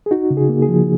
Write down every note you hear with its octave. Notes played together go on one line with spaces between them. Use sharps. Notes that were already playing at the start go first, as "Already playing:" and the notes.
G#4
D#4 F#4
C#3
G#4
A#3
G#4
F3